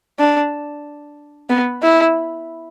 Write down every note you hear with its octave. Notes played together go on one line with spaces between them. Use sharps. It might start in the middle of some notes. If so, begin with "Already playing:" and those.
D4
B3
E4